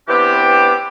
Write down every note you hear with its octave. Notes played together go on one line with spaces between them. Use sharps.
E3 B3 C4 D4 G4